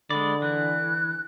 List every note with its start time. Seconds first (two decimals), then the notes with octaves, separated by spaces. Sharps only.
0.10 D3 G#3 D5 B5
0.42 E3 F#6